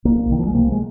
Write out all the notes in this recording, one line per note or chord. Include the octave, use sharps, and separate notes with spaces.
C2 A#3
C2 D#3
F3
G#3
C3 A#3
G#3